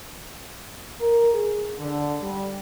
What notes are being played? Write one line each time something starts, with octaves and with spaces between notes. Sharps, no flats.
A#4
G#4
D3
G3